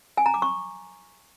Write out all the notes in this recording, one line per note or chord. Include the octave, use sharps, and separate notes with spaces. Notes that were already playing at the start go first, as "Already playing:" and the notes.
G#5
A#5
D6
C#6